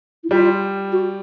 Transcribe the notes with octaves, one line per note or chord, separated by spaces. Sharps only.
E4
G3 F4
F#4